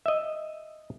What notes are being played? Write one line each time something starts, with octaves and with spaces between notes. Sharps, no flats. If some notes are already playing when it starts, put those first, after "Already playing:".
D#5 E5